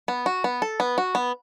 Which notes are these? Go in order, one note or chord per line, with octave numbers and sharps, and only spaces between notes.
B3
F#4
B3
A4
B3
F#4
B3